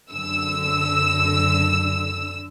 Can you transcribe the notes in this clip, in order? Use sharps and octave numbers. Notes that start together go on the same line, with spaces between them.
F#2 D3 E6